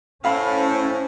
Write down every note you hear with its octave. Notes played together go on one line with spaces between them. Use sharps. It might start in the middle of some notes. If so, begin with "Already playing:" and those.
A2 C#4 C5 F5 B5